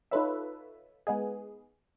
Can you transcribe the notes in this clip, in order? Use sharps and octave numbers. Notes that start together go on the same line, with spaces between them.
D#4 F4 A4 B4 C#5 E5
G#3 B3 D#4 G#4